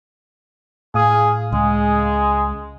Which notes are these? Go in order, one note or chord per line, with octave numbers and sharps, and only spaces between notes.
A2 G#4 F5 D#6
C#2 G#3 G#4